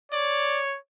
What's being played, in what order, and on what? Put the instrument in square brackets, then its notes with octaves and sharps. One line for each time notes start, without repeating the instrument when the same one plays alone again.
[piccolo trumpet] C#5 [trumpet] D5